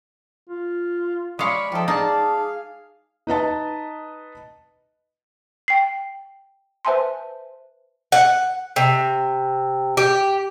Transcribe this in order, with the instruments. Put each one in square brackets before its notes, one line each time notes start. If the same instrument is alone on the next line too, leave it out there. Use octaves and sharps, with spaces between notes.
[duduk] F4
[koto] G#3 F5 [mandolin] C#5 C#6 [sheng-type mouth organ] D5 B5
[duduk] F3 [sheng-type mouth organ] D#4 F4 [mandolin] G4 A4
[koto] D#4 [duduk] G#4 [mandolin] D5 A5 [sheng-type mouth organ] F5
[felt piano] D#4 B4 D#5 A5
[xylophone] G5 C7
B4 C5 E5 G#5 A5 C6
[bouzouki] F#5
C3
G4